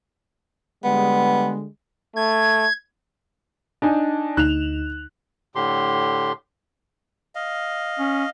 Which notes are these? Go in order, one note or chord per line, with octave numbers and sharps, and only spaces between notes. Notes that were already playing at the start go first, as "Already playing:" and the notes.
D3 G3 G#3 B3
A3 G#6
D4 D#4 G#5
D2 D#4 F#6 E7 F7
A2 D3 G4 C6
D#5 F5
C#4